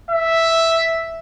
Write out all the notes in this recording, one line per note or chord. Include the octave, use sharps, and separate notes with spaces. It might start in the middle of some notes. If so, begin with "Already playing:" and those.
E5